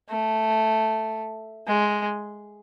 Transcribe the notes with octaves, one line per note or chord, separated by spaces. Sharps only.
A3
G#3